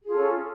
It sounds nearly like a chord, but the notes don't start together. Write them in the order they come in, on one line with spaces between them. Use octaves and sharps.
G#4 F4 A4 C#4